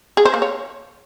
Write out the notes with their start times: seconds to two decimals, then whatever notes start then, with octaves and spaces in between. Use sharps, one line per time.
0.17 G#4
0.25 C5
0.34 A#3
0.42 C#5